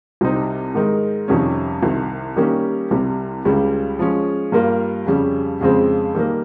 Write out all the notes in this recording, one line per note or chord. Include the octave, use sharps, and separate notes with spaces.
C2 C3 G3 C4 D#4
G#2 D#3 G#3 D#4 A#4
F2 C3 D#3 G3 C#4
C2 C3 D#3
D#3 G3 A#3 C#4 G4
C2 C3 G3
C#2 C#3 G3
F3 G#3 C#4
G2 G3 A#3 F4 A#4
F2 C#3 G3 C#4
F2 C#3 G#3 C4
D#3 G3 A#3